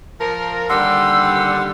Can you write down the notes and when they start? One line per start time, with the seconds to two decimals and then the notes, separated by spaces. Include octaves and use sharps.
0.19 F3 A#4
0.69 D#2 D3 G3 F#5 C6 E6